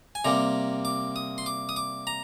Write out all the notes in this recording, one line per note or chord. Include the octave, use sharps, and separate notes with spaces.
G#5
C3 G3 A#3 A#5
D6
D#6
C6
D6
D#6
D6
A#5